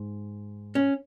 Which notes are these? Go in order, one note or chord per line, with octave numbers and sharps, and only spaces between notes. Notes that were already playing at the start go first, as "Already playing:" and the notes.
Already playing: G#2
C#4